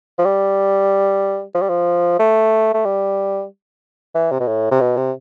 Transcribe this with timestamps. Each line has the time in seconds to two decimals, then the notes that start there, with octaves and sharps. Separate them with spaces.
0.18 F3
0.25 G3
1.55 F3
1.61 G3
1.69 F3
2.19 A3
2.74 A3
2.85 G3
4.15 E3
4.32 C3
4.40 B2
4.47 A2
4.71 C3
4.80 B2
4.97 C3